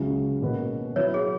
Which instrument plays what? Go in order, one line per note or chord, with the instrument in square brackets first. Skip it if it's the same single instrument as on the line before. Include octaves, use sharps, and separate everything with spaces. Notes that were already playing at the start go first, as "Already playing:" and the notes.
Already playing: [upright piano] C#2 C#3 F#3 C#4 E4
B2 A#3 C#4 F#4 B4
[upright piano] F#3 B3 E4 [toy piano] C#5
[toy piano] G#4